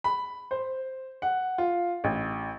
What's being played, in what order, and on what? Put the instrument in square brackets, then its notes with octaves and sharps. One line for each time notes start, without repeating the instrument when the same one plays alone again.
[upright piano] B5
C5
F#5
F4
A1